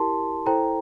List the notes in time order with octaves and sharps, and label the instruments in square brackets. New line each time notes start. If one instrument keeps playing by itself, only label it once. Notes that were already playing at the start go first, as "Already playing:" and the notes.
Already playing: [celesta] E4 G4 A#4 A5 C6
E4 A4 C5 G5 A#5